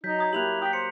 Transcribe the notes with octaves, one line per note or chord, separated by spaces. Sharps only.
F#3 D#4 G6 B6
A#5 D#6 G#6
A#3 E4 G4 F#6 F7 F#7
G5 D#6 B6
C5 C#7